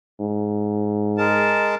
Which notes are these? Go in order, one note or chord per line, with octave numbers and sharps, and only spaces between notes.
G#2
G#3 A#4 A5